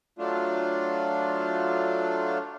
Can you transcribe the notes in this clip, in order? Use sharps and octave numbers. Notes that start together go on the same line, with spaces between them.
F#3 A3 D4 F4